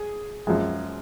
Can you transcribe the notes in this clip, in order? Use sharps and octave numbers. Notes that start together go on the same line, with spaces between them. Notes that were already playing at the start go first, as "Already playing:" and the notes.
Already playing: G#4
F#2 F3 G#3